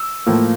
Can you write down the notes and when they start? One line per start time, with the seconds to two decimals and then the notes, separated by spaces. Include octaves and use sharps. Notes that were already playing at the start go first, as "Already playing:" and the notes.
Already playing: E6
0.26 A2 F3 A#3